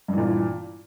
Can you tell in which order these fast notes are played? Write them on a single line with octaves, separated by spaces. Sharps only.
G2 E3 A#2